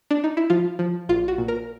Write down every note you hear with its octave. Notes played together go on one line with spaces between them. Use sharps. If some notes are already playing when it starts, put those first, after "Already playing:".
D4
D#4
E4
F3 F4
F3
A#1 F4
F#4
A#2
A#4